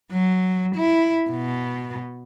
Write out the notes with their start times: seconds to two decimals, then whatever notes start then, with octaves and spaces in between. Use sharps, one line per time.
0.12 F#3
0.76 E4
1.30 B2